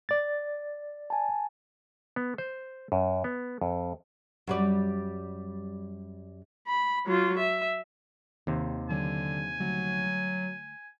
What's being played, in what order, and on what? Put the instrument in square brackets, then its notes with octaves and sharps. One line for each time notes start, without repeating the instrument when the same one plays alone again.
[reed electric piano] D5 A6
[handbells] G#5 A5
[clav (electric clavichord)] B3
C5
F#2
B3
F2
[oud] F#2 G3 D5
[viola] B5
F#3 F4
E5
[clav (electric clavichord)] D#2 C3 [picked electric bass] D#3
[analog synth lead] D3 [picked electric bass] F#3 [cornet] G#5
[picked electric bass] D3 G3 A3 [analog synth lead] F#3